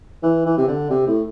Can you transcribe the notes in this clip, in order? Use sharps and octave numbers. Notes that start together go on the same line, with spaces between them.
E3
E3
C3
D3
C3
A2